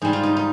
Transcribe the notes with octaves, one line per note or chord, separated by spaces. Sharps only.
G#2 G3 D#4
F4
D#4
D#4